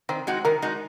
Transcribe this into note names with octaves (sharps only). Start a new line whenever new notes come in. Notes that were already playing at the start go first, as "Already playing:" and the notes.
D#3 C4
G#3 D#4 F#4
D#3 A#4
G#3 D#4 F#4